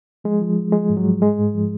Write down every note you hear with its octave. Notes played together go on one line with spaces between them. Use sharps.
F3 G#3
F3
F3
F3 G#3
G#2
F#3
G#2
G#2 G#3
G#2
F3